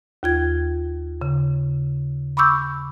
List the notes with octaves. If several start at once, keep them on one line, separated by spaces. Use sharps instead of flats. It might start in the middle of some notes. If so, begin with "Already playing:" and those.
D#2 F4 G#6
C#3
B5 C#6 D6 E6 G6